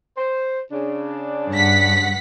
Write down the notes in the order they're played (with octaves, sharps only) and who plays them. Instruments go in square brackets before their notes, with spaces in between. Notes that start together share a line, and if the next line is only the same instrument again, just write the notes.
[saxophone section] C5
C#3 D4
[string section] G2 F#5 B6